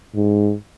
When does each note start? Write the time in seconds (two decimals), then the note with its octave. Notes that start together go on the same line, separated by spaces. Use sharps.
0.15 G#2